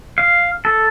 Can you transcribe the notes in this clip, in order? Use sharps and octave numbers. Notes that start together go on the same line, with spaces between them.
F5
A4